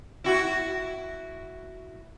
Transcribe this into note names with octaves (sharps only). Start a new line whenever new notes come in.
E4 F#4